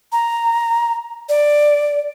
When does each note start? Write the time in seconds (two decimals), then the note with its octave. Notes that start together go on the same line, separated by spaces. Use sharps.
0.12 A#5
1.29 D5